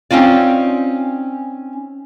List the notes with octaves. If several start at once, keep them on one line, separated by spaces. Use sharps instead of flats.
C4 C#4 D#4 F4 D5